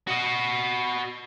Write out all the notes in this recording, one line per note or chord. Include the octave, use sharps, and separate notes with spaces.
F#4 D#5